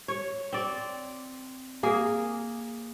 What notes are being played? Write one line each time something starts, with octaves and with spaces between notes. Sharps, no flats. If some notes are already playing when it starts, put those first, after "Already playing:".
C#5
C4 D5
A#3 G#4